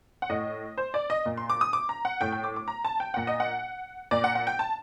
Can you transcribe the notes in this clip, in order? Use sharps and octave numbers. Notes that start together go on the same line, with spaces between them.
F#5
A2 D#5
C5
D5
D#5
A#2
C6
D6
D#6
D6
A#5
F#5
A2 G5
G5
D6
D6
A#5
A5
G5
A#2 F#5
D#5
F#5
A#2 D5
F#5
F#5
G5
A5